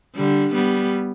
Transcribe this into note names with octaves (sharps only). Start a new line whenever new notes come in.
D3 G3
G3 B3